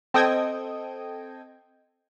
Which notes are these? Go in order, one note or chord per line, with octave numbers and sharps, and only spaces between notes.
C4 A4 D#5 G5 D#6 G#6